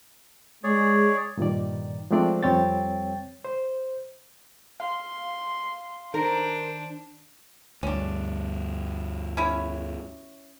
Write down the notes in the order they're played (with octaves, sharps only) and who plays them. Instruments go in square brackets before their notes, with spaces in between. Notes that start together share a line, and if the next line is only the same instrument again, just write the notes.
[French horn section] G#3 [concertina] G#4 C#5 D5
[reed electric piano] G2 A#2 D#3 D5
F3 G#3 A3 C4 D4 D5
F2 G3 C4 C#5 G5 A6
C5
[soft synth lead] F5 [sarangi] C6
[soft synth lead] D#3 [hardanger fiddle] D4 [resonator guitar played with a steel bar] A#4 [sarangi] C5
[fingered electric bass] D2 G2 [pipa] C#4 D4
[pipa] C#4 E4 C#5